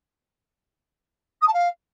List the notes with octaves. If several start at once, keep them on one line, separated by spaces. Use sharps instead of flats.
D#6
A5
F5